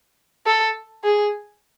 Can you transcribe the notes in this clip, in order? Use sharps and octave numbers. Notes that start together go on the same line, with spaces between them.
A4
G#4